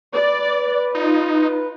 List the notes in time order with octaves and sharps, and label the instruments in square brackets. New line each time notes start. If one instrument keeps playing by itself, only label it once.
[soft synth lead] B4 [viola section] D5
[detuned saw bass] D#4 [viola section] F4